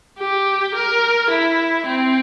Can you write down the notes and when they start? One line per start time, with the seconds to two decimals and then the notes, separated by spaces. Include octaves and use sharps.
0.18 G4
0.74 A#4
1.29 E4
1.86 C4